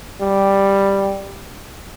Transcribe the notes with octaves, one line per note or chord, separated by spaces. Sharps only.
G3